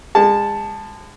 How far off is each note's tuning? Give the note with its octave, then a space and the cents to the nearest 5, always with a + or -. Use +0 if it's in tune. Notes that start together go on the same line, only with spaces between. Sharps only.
G#3 -35 A5 +0